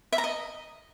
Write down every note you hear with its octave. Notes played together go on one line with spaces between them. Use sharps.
E5
A#5
D#5